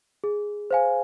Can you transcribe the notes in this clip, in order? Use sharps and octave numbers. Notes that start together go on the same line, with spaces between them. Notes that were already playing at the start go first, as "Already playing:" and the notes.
G#4
C5 F5 G#5